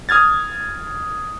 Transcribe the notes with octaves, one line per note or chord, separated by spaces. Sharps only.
D#6 F6 G#6 A6